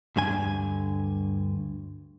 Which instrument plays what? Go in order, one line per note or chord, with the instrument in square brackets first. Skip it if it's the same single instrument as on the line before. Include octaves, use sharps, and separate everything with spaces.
[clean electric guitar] D2 G2 D3 G#5